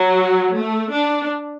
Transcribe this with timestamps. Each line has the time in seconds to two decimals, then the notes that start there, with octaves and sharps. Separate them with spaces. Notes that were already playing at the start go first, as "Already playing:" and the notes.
Already playing: F#3
0.56 A3
0.93 D4